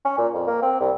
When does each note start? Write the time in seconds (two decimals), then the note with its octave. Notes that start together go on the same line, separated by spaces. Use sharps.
0.05 C#4
0.18 A#2
0.34 F2
0.47 A#3
0.62 C4
0.80 C2